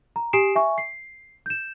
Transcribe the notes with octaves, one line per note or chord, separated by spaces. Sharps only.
A#5
G4 G#5 D#6 C7 D7 E7
E5 G#5 C#6
C7
G6 E7